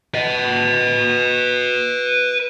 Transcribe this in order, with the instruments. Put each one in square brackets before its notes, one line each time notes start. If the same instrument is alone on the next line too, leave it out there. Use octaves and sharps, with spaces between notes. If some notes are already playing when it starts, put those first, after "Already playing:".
[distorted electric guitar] B4 D#5